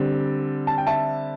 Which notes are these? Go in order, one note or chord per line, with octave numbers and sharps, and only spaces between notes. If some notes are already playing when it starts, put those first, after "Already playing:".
Already playing: D3 G3 C4
A5
G5
E5 A5